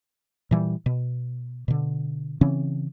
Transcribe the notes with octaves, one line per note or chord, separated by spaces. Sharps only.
A#2 E3 G3
B2
B2 D3
C#3 E3 C4 C#4